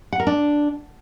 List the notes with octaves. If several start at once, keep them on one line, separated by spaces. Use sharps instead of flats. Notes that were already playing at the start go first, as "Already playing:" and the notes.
F#5
A#4
D4